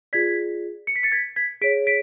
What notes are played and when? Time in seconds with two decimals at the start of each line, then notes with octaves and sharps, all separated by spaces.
0.13 F4 G#4 D5 G#6 B6
0.87 C#7
0.96 B6
1.03 A6 C#7
1.12 G#6 B6
1.36 G#6 B6
1.61 G#4 C#5 B6 D7
1.87 B6 D7